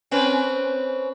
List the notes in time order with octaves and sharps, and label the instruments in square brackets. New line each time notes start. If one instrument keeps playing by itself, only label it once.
[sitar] C4 C#4 B4